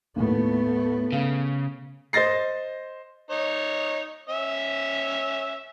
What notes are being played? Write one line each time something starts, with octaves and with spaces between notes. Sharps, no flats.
D#2 A2 A3 B3
C#3 F5
C5 D#5 A6 A#6 C7
D#4 C#5
C#4 E5